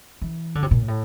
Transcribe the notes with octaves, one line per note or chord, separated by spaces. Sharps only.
E3
D3
C3
A#2
A2